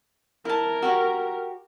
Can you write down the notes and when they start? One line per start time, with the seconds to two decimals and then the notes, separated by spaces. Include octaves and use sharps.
0.45 E4 A#4 A5
0.82 F#4 G4 C#5